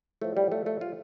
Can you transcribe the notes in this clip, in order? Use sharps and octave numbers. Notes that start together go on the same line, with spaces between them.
A2 F3 A3
G3
A3
A3
F4